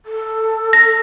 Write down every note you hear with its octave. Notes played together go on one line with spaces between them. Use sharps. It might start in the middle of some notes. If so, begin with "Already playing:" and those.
A4
A#6